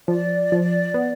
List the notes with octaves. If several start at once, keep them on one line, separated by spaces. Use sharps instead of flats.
F3 D5
F3
B3